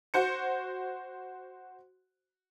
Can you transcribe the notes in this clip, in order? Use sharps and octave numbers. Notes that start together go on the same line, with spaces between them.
F#4 C5 C#7